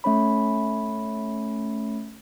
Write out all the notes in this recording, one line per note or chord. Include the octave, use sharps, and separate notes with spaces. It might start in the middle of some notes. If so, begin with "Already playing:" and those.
A3 C#4 C#5 B5